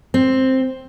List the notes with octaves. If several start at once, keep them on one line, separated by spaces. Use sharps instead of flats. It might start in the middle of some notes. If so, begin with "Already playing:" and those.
C4